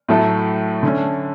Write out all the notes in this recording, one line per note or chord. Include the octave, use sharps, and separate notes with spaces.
A2 F#3 A3 E4 A4
D3 A3 C#4